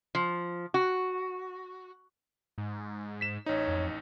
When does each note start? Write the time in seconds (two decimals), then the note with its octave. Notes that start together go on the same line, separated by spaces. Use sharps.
0.15 F3
0.74 F#4
2.58 G#2
3.21 B6 E7
3.46 A1 D#4 C#5
3.68 F2